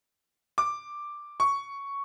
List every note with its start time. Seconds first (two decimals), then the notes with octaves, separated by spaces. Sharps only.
0.58 D6
1.40 C#6